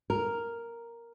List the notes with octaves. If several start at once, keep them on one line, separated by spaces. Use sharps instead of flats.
A#4